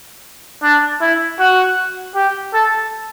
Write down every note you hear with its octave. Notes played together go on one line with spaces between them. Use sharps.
D4
E4
F#4
G4
A4